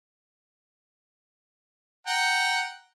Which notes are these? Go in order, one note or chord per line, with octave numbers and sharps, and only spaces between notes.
F#5 G5 A#5